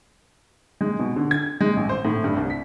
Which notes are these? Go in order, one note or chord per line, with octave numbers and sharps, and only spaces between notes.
G#3
B2
D3
G#6
G#3
A1
C5
A2
G2
C2
B6